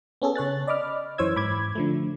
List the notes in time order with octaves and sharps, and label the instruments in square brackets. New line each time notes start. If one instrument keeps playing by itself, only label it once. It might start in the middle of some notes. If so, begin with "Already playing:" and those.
[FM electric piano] B3 C#4 G#4 A4
C#3 C#5 F#6 A6
D5 D#5 B5 D6 F6
F#2 E3 C5 C#5 E6 G#6
G#2 B5 D6 G#6
D3 F3 A3